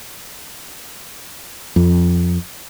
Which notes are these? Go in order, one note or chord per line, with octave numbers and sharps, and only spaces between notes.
F2